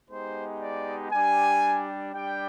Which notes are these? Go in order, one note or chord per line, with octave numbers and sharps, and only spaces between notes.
G#3 B3 D#4 G4 C5
D5
G3 D4 G4 G#5
G3 D4 G4 G5